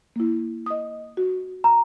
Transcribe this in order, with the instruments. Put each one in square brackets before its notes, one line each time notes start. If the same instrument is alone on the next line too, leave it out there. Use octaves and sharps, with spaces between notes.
[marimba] A#3 E4
D#5 D#6
F#4
[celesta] A#5